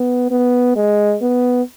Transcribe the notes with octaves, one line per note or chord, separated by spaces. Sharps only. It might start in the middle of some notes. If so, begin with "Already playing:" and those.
Already playing: B3
B3
G#3
B3